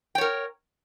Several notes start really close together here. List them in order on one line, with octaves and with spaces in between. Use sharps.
G5 C#5 A#4